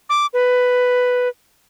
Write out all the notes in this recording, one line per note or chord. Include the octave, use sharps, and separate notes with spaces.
D6
B4